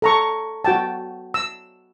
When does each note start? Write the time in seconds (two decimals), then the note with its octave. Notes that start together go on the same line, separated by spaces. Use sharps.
0.02 A4 A#5 C#6
0.65 F#4 G5 A5
1.34 E6